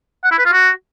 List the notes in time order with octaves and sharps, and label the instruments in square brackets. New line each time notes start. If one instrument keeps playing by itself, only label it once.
[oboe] F#5
E4
B4
F4
F#4